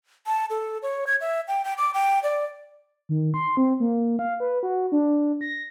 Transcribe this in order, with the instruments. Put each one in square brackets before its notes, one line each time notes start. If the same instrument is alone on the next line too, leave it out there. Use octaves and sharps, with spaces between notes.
[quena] A5
A4
C#5
G#6
E5
G5
G5
D6
G5
D5
[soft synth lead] D#3
C6
C4
A#3
F5
B4
F#4
D4
A#6